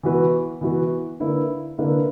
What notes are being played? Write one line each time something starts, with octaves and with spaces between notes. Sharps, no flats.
E3 B3 F#4 B4
E3 B3 F#4 B4
D3 A#3 E4 B4
D3 A#3 E4 B4